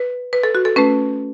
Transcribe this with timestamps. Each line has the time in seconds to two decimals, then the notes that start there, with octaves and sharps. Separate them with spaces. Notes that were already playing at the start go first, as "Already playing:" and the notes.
Already playing: B4
0.33 B4
0.43 A4
0.55 F#4
0.65 A4
0.76 A3 C#4 B4